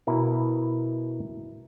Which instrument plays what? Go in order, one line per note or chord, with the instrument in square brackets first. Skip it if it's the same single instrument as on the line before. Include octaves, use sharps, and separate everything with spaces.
[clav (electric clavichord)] B2 E4 A#4